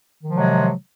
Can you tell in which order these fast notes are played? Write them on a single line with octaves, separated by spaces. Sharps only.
D#3 F3 C3 G#3 F#3